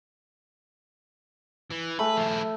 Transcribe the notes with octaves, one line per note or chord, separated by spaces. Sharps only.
E3
A3 B4 G#5
F3 E4